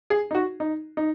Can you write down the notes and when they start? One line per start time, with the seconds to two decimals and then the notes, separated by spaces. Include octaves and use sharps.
0.10 G#4
0.31 D#4
0.35 F#4
0.60 D#4
0.97 D#4